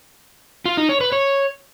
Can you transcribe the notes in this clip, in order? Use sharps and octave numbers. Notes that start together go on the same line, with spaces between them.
F4
D#4
C#5
B4
C#5